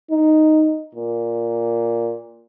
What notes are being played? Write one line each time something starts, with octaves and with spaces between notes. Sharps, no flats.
D#4
A#2